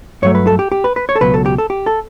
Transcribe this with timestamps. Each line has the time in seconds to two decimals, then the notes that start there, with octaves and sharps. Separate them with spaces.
0.22 G2 F#3 A3 C#5
0.35 B4
0.47 A4
0.59 G4
0.72 G4
0.84 B4
0.96 B4
1.09 C#5
1.16 A4
1.21 C#2 B2 F#3 B4
1.34 A4
1.46 G4
1.58 A4
1.70 G4
1.86 A4